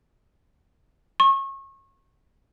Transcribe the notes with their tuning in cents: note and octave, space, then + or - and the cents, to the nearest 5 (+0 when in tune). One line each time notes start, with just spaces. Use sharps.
C#6 -30